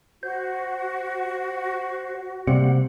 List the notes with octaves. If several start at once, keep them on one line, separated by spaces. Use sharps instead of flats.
F#4 C5
C3 G3 A#3 F#5